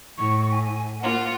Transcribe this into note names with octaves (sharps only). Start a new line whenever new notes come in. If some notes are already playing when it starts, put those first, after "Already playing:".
A2 C#6
G#5
A#3 F4 F#5